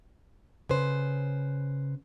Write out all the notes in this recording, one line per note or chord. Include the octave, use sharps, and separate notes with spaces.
C#3 B4 C5